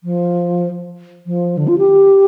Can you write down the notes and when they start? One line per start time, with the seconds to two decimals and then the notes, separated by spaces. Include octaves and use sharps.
0.04 F3
1.26 F3
1.57 D3
1.68 F4
1.78 G4